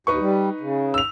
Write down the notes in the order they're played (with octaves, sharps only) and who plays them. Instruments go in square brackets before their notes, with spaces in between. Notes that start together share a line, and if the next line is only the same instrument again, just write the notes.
[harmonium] D#2 [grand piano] D#4 B4 C#6
[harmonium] G3
C#3
[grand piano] E6 F7